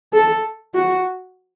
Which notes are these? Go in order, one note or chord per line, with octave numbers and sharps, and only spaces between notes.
A4
F#4